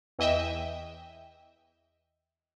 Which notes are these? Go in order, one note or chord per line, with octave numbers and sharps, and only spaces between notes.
E2 E3 D#5 E5 G5